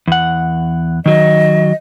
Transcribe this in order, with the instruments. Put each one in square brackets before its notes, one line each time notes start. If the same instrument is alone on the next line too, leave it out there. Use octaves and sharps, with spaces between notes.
[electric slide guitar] E2 F#5
[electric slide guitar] D#3 F#3 [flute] D#5